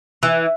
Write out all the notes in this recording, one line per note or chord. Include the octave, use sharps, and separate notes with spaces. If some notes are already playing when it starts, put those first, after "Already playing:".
E3